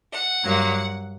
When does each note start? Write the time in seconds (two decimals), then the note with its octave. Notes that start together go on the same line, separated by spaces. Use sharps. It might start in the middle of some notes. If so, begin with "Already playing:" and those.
0.12 F#5
0.45 G2 F#3 A#3